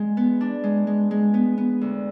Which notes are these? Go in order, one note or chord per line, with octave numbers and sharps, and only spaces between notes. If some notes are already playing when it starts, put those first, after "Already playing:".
Already playing: G#3
B3
D4
G#3
G#3
G#3
B3
B3
D2